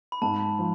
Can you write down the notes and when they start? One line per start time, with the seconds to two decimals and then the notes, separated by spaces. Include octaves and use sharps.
0.12 B5
0.22 G#2 A5
0.59 F3